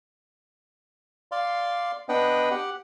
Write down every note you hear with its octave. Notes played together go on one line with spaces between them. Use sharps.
D5 F5 C6
B3 D4 B4 D#5 F#5 G5
G4 F#5